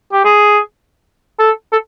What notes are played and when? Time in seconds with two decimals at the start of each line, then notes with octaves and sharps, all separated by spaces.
0.13 G4
0.24 G#4
1.39 A4
1.72 A4